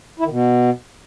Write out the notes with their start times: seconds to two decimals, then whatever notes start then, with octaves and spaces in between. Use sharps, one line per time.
0.19 E4
0.25 D#3
0.30 B2